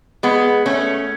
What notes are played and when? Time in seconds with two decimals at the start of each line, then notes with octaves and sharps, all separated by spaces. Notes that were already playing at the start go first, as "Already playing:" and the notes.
0.23 G#3 B3
0.66 A3 C#4